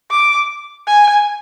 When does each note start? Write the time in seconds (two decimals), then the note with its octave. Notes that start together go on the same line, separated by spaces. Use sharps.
0.11 D6
0.87 G#5